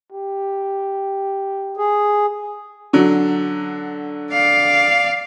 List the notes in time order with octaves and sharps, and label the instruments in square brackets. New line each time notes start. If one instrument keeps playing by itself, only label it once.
[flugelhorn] G4
[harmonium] G#4
[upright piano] D3 F#3
[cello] D5 F5